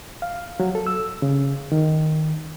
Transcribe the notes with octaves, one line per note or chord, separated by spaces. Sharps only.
F5
F#3
A4
E6
C#3
D#3